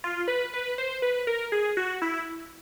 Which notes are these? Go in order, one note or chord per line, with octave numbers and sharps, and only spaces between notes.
F4
B4
B4
C5
B4
A#4
G#4
F#4
E4